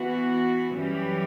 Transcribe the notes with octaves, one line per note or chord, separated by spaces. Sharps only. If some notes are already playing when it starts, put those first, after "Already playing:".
Already playing: E3 B3 F#4
F#2 E3 G3 C#4 G4